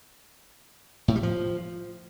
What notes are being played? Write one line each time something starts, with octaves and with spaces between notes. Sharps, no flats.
A2
G3
F3